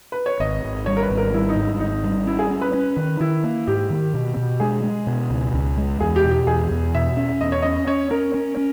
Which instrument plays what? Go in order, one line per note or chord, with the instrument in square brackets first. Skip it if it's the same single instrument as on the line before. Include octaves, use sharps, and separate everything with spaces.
[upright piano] B4
C#5
[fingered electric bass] G#1 [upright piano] D#5
[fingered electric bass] G#1
[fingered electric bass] G3 [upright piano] C#5
[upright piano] A#4
B4
[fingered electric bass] G#1
[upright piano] A#4
[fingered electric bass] G3 [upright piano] E4
[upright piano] D#4
[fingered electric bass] G#2
[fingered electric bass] G#1 [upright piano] D#4
[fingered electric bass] G3
[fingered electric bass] C#4 [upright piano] E4
[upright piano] G#4
[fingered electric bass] C#4
[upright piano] B4
[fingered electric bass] C#4
D#3
[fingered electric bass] D#3 [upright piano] E4
[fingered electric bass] A#3
[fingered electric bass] G#2 [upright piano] G4
[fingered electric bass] D#3
B2
B2
[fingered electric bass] G#3 [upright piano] G#4
[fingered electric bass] G#3
B2
C#2
C#2
G#3
[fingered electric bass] E2 [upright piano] G#4
[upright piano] G4
[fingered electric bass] B2
[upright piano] G4
[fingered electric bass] E2 [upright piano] G#4
[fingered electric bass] E2
[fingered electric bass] B2 [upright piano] E5
[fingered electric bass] C#4
[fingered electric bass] E2 [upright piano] D#5
[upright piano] C#5
[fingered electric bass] C#4 [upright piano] D#5
[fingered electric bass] C#4 [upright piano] C#5
[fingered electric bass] C#4 [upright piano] A#4
[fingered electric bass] C#4
C#4